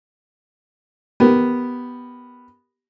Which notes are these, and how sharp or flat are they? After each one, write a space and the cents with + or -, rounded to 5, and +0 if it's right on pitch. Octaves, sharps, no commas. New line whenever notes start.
B3 +0 G4 -10 A#4 +0